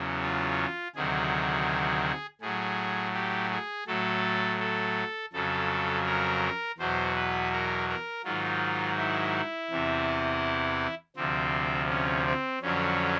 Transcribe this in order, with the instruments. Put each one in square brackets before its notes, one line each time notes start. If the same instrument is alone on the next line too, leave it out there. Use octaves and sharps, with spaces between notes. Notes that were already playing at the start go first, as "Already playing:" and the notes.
Already playing: [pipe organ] E2 C#3 F#3
F4
D2 C3 D#3 F#3 G#4
A2 F#3 G#4
G4
G#4
A2 F#3 A4
A4
F2 C#3 F#3 A4
A#4
E2 B2 F#3 C5
B4
A#4
A#4
G#2 D#3 F#3 F4
E4
E2 C3 E3
D2 C3 F3 C4
C#4
C4
F2 D3 F#3 C#4